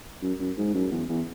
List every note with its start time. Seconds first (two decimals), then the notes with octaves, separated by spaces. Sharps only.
0.22 F#2
0.40 F#2
0.57 G#2
0.74 F#2
0.91 E2
1.09 E2